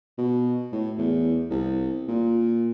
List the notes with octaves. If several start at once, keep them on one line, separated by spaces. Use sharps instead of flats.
B2
A2
E2
C2
A#2